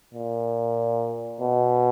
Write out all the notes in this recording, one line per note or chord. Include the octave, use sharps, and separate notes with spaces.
A#2
B2